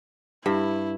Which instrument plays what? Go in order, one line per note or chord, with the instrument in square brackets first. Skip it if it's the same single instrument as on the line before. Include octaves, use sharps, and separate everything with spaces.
[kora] G2 [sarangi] E4